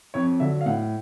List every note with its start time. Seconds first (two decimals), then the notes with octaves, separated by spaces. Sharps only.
0.14 F2 C#5
0.40 D3 F#3 E5
0.61 F5
0.66 A2 F#5